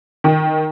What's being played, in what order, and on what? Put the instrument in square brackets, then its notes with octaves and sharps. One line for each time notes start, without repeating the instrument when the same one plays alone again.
[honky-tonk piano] D#3